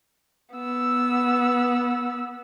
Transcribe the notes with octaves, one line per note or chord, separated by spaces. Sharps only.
B3 E6